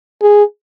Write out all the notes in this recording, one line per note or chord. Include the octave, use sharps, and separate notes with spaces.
G#4